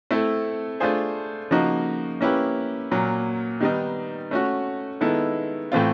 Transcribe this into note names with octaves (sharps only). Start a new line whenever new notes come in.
A3 C4 E4 A4
A3 D4 F4 G#4 C5
C#3 F3 A#3 D#4 F#4
A#3 C#4 E4 G4 B4
A#2 F#3 A#3
D#3 G3 B3 D#4
A3 C#4 F#4
D#3 G#3 B3 E4 A4
A2 E3 A3 C4 F4